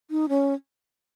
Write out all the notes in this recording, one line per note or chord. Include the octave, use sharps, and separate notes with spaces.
D#4
C#4